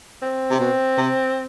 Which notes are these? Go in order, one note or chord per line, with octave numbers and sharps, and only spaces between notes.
C4
C3
B2
C3